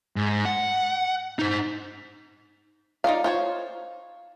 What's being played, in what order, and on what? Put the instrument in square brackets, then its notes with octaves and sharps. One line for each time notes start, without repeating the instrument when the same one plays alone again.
[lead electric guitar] G#2
F#5
D#4 C5
[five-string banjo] D#4 F4 D5 F5
F4 C5 C#5